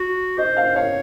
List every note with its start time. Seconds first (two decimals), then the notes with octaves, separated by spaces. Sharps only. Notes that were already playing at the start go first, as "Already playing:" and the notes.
Already playing: F#4
0.38 C5 D#5
0.57 F5
0.75 C#5 F5